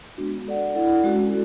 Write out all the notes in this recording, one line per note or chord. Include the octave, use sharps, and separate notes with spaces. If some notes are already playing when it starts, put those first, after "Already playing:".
G#3 B3 D4 F#4
D4 A4 D5 F#5
E4 A4 D5 F#5
G#3 C#4 F#4 A4